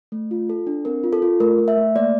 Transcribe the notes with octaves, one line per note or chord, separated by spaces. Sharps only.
A3
F4
A4
D4
C4 A#4
F4
A4
F4
A3 A#4
A3
E5
A3
A#3 D5